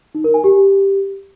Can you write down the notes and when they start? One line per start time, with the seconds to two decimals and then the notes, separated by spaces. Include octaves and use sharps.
0.15 D#4
0.24 A#4
0.34 G#5
0.44 G4